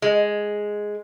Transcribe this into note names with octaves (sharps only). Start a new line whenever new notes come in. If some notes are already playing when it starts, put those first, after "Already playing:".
G#3